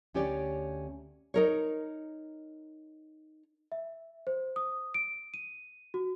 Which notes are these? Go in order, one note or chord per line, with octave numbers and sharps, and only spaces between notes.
D2 C#4 G4 C#5 D5
D#4 A#4 C#5
E5
C5
D#6
D7
D#7
F#4